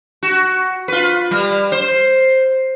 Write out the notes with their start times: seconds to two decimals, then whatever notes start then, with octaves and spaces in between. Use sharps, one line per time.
0.23 F#4
0.88 F4 B4
1.31 G3
1.72 C5